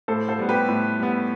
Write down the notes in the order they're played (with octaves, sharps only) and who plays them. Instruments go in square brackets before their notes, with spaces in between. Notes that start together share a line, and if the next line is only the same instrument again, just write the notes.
[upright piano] A2 A4 C5
A4 C5
G3 B3
G4 B4
A2
G3 B3